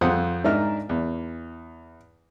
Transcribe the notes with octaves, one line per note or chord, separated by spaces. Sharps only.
F2 C5 F#5 D#6
G#2 D4 D#4 A#4 E5 F6
E2